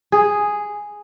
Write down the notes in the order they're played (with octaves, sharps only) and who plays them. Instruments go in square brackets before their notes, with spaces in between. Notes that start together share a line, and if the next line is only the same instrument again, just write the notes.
[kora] G#4